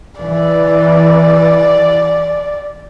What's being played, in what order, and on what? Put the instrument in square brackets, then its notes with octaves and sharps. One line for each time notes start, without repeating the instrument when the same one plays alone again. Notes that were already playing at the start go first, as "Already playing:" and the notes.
[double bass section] E3 [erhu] D5